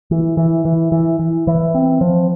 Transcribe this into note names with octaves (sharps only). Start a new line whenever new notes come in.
E3
E3
E3
E3
E3
E3
C4
F3